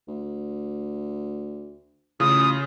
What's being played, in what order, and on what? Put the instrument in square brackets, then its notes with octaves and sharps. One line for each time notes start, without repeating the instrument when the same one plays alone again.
[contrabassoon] D2
[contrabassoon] A1 [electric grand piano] C#3 F4 [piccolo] D#6